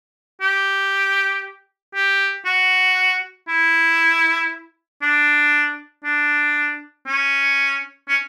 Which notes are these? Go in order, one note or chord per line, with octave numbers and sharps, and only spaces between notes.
G4
G4
F#4
E4
D4
D4
C#4
C#4